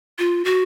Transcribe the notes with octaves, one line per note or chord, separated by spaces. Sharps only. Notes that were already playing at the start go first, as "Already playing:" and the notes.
F4
F#4